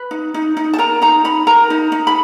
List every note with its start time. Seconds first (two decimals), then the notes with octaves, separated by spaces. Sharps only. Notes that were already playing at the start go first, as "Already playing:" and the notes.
Already playing: B4
0.11 D#4
0.34 D#4
0.57 D#4
0.73 A5
0.78 A#4 A#5
1.02 D#4 A#5
1.25 D#4 B5
1.47 A#4 A#5
1.70 D#4
1.92 D#4
2.07 B5